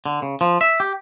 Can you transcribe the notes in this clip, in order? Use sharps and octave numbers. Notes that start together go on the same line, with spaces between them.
D3
C#3
F3
E5
G4